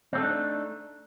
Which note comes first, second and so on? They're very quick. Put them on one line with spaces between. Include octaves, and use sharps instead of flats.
C4 A3 A4 D#4 D4